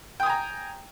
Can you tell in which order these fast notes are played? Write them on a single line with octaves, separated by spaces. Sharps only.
G5 D#6 G#5 A#5